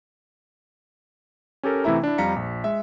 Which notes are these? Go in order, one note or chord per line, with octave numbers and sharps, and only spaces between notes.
C#4 G4 A4 A#4
C3 E3 A3 E4 E5 A#5
D4 E4
F2 G3 F5 A#5 B6 C#7
A#1
G#3 E5